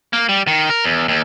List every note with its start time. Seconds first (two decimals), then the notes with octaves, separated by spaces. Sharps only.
0.13 A#3
0.29 G3
0.47 D#3
0.70 A#4
0.84 E2
1.08 D#2